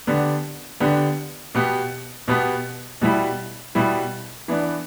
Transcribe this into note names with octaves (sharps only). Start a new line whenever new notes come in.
D3 B3 D4 G4
D3 B3 D4 G4
B2 B3 G4
B2 B3 G4
B2 G3 E4
B2 G3 E4
E3 B3 D4